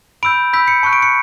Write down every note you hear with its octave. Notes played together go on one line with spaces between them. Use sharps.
B5 E6 G6 D7
B5 E6 G6 B6
C#7
A5 C#6 F#6 C#7
D7
C#7